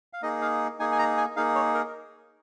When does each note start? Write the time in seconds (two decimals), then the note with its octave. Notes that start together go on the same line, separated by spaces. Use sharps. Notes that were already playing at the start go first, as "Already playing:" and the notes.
0.13 F5
0.22 A#3 D#4 G#4 D#5
0.42 F5
0.79 A#3 D#4 G#4 G#5
0.92 G#5
0.99 A#5
1.17 G#5
1.36 A#3 D#4 G#4 F5
1.55 C#5
1.75 A#4